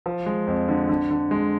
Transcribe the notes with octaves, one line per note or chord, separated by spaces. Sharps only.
F3
G#3
F2
D3
D3
D3
G#3